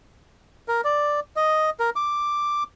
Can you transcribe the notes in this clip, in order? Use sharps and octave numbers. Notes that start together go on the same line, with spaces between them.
A#4
D5
D#5
A#4
D6